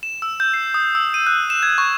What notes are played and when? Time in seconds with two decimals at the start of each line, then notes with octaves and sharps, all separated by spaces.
0.03 E7
0.22 E6
0.40 G6
0.54 C7
0.74 D#6
0.95 E6
1.14 D#7
1.27 F#6
1.50 E7
1.63 G#6
1.78 C#6